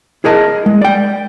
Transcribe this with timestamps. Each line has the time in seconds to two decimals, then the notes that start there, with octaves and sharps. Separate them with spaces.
0.24 E4 G#4 A#4 D#5 A5
0.66 G#3
0.81 D5 G5